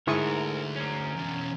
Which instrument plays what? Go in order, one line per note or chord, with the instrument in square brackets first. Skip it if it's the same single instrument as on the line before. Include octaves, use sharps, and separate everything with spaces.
[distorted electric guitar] D2 [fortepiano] G#2 [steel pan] E4 C#6 D#6 [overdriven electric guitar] A4 A#4
[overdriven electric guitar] C#4 A#4
[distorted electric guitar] E2 B2